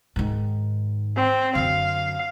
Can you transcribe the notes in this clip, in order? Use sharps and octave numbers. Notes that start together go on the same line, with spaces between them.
G#2 D#3
C4
F#2 D3 F5